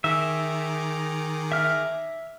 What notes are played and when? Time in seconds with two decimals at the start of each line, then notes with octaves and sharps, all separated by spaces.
0.04 D#3 G#4 E5 A#5 D6
1.52 E5 F6